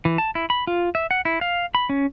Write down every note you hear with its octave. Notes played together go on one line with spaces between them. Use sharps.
E3
A5
E4
B5
F4
E5
F#5
E4
F5
B5
C#4